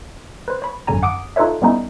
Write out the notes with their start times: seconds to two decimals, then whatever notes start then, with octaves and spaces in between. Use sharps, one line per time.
0.48 B4 C5
0.62 C#5 B5
0.87 G#1 F#2 D3 C#4 G#5 A#5
1.03 F#5 D6 D#6 D7
1.36 D#4 F4 A4 B4 C#5 E5
1.62 G3 B3 C#4 D#4 E4